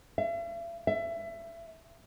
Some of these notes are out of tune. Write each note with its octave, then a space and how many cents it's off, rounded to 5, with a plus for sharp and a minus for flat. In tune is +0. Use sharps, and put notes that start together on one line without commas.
E5 +45
E5 +25